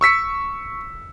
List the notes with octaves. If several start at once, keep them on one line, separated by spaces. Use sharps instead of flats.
C#6 E6 B6 C#7